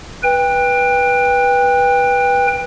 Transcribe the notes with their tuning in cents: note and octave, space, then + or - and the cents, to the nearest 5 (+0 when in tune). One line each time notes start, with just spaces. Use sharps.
B4 -10 G5 +25